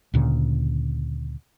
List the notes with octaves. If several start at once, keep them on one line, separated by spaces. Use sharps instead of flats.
D2 A#2 C#3